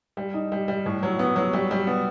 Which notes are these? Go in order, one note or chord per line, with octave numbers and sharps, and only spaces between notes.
G3
D#4
G3
G3
A2
F#3
B3
F#3
G3
G3
B3